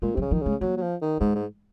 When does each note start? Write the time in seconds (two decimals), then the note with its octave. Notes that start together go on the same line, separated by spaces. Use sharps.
0.02 A#2 G#3
0.15 C3 F#3
0.21 C#3
0.31 D#3 F3
0.42 C#3 G#3
0.61 F#3 A#3
0.77 F#3
0.82 F3
1.02 D#3
1.20 G#2 G#3
1.35 G#2